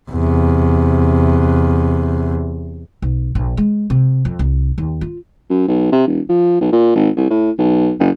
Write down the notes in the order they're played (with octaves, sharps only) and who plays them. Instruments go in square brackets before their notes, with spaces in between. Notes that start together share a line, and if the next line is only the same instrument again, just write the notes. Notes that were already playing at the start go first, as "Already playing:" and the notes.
[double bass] E2 C3
[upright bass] B1
A#1
G#3
C3
F2
C2
D#2
F4
[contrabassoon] F#2
B1
C3
E1
F3
B1
A#2
G#1
C2
A2
B1
F#1